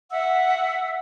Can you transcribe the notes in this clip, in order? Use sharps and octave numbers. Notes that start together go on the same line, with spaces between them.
E5 F#5 E6